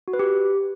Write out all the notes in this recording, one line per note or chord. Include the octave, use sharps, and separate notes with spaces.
F#4
B4
G4